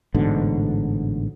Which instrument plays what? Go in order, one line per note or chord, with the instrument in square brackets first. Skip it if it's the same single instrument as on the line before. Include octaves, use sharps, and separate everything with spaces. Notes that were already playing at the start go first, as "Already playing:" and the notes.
[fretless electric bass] A1 G#2 B2 D3